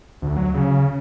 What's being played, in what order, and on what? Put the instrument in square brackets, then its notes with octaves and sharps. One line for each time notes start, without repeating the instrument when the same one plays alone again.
[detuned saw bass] D2
F#3
C#3